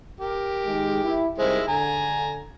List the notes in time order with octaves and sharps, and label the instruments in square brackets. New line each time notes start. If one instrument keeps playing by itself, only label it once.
[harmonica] G4 A#4
[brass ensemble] D#3 G#3
E4
[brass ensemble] C2 C5 [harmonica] D#3 G#3 E4
[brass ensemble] D3 [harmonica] G#5 A#5